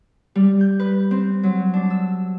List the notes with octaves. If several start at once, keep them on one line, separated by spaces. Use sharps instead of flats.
G3
G6
B4
C4
F#3
D4
E6